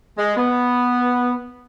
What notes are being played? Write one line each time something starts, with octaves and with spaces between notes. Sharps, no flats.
G#3
B3